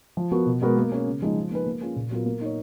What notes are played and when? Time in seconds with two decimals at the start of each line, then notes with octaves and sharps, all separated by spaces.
0.17 F3
0.31 B3 F#4 A#4
0.46 B2
0.62 G#3 B3 F#4 A#4
0.76 A#3
0.92 C#4 G#4 C#5
1.07 C#3
1.22 F3 G#3 D#4 G#4
1.37 F3
1.51 A#3 D#4 G#4 B4
1.66 A#3
1.81 C#4 F4 G#4
1.96 A#2
2.11 F#3 B3 F4 A#4
2.26 A#3
2.41 D#4 A#4 C#5